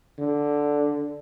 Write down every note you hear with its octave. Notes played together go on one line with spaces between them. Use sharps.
D3